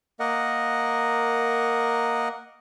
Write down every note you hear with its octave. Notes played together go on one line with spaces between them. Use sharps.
A#3 A#4 D#5 F#5